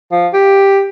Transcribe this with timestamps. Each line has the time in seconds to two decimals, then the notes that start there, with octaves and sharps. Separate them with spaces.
0.12 F3
0.33 G4